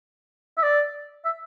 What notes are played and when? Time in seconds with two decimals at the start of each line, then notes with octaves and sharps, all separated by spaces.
0.58 E5
0.63 D5
1.25 E5